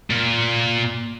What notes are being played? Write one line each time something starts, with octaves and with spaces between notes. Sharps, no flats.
A#2